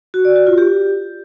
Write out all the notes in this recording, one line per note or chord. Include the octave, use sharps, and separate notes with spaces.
F#4
D5
F#4
F4
G4